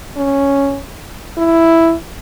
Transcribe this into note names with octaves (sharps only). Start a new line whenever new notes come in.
C#4
E4